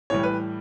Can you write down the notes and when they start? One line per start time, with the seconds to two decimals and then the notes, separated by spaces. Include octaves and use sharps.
0.10 A2 E3 G3 C#5
0.23 B4